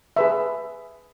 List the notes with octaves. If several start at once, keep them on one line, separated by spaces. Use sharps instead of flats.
G#4 B4 E5